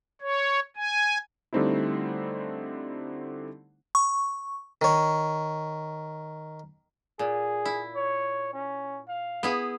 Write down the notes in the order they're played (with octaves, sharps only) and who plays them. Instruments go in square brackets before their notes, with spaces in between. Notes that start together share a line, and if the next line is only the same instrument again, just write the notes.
[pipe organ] C#5
G#5
[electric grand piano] D3 G3 A3 C4 D#4 E4
[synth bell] C#6
[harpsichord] D#3 C#5
[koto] A#2 [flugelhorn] G#4
[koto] E4
[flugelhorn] C#5
C#4
F5
[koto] B3 E4 G#4